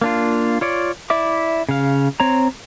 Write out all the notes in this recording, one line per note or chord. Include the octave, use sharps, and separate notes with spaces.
A#3 D4 F4
F4 C#5 D5
E4 D5 E5 D6
C#3 F5
C4 C#5 A#5